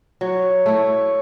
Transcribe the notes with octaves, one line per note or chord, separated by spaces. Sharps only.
F#3 C#5
A3 E4